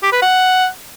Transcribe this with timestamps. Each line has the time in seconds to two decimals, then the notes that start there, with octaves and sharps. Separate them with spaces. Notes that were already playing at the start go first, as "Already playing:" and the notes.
0.03 G4
0.12 B4
0.22 F#5